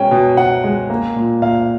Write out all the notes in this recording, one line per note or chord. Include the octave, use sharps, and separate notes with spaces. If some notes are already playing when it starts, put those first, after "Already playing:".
Already playing: B2 G#3 C#4 G5
B2
B2 F#5
G#3
A#3
A#2
A#2 F5